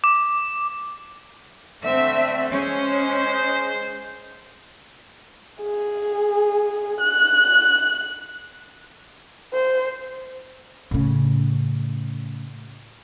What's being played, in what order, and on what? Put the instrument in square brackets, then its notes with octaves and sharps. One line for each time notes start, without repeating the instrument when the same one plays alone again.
[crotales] D6
[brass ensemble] D3 A3 [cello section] C4 E5
[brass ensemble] G#3 C5 [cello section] C#4
[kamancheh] G#4
F#6
C5
[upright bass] A2 C#3